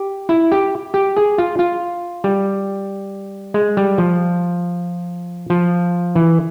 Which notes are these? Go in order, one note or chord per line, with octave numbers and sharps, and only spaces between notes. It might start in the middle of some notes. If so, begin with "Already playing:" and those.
Already playing: G4
E4
G4
G4
G#4
F4
F4
G3
G#3
G3
F3
F3
E3